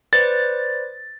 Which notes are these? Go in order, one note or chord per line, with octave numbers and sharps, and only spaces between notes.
B4 C5 D5 A6